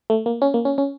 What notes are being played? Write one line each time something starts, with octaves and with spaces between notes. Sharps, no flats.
A3
A#3
C#4
A#3
C#4
C#4